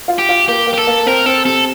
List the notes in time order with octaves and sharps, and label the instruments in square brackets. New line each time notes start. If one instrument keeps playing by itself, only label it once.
[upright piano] F4
[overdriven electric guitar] G4
[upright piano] F4
[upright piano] A#3 [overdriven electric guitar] G4
[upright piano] A#3
[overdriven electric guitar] G4
A4
[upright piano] A#3
[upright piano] C4 [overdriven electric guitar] A#4
[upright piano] C4 [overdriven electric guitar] A4
[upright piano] C3 [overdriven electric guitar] A4